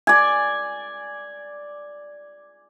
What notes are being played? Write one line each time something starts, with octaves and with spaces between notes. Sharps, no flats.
D5 G#5